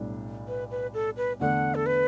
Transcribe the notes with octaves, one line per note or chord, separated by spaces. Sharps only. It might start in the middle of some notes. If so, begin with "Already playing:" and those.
Already playing: B1 A2 G3 D4
B4
B4
A4
B4
E2 D3 A3 F#5
A4
B4